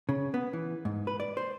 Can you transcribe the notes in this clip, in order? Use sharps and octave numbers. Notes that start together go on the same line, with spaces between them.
C#3
B3
E3
G#2
B4
D5
C5